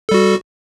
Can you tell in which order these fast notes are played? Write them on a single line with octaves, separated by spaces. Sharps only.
A4 G3 F#4